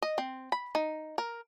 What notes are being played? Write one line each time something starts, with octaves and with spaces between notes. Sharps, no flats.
D#5
C4
B5
D#4
A#4